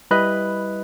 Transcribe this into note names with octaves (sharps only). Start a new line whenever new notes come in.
G3 E4 B4 D#5 B5 F#6